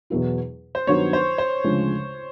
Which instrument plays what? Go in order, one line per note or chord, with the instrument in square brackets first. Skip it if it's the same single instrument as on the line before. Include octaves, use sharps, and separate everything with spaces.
[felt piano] E2 B2 F#3 B3 E4
[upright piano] C5
[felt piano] G2 D#3 F#3 B3 D#4 [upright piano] C#5
[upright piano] C5
C5
[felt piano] D2 C#3 F3 G#3